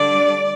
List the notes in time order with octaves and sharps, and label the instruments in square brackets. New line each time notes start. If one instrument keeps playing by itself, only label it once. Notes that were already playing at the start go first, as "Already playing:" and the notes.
Already playing: [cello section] D3 G3 D4 D5